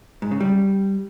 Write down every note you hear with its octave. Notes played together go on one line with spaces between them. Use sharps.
G#2
C#3
G3